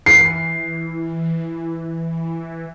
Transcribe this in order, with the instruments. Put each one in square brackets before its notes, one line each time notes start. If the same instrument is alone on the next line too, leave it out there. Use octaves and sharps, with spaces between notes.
[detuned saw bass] E3 [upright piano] C7